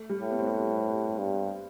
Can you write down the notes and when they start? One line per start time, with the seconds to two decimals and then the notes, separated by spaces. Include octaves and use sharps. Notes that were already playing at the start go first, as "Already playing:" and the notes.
Already playing: A3
0.10 G3
0.21 A2
0.31 B3
0.39 C4
0.46 B3
1.19 G2